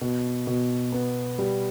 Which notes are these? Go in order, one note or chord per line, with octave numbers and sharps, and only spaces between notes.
B2
B2
B3
G3